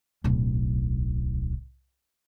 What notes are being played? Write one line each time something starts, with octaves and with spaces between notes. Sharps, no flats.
D1 B1